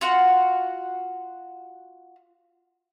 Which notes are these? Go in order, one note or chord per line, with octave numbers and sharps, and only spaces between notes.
F4 F#4 F#5